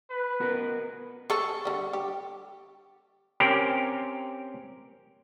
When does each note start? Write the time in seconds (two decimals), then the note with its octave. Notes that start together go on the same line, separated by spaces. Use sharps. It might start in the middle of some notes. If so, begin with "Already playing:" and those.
0.10 B4
0.40 B3 F#4 A#4
1.30 G#4 A4 C#6
1.65 D3 G3
1.93 G4
3.40 C4 C#4 G4 A#4